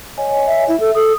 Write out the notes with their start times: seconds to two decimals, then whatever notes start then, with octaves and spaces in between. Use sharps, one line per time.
0.18 C#5 D#5 G#5
0.47 E5
0.69 E4 E5
0.80 A4
0.95 A4 D#6